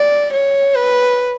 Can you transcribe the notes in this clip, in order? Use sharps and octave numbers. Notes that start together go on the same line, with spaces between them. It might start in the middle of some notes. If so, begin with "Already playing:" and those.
Already playing: D5
C#5
B4